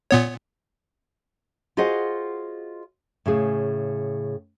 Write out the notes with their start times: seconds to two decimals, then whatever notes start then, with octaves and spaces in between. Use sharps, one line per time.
0.11 A#2 B3 C#5
1.77 F4 F#4 G#4 C5 D#5 F#5
3.26 A2 C#3 G#4